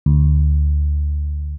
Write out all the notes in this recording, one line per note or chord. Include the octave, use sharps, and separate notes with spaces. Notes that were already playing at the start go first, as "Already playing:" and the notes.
D2